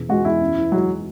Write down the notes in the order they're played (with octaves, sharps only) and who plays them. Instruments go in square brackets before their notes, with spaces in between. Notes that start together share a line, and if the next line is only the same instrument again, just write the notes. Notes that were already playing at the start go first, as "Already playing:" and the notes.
Already playing: [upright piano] E2 B2
[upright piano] G#3 [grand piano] F#4
[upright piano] E2 [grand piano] E4
[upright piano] F#2
E3
[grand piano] F#3 [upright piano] G#3